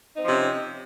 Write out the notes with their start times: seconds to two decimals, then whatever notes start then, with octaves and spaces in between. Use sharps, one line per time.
0.14 D#4
0.19 C4
0.23 F3
0.27 C3
0.31 C#4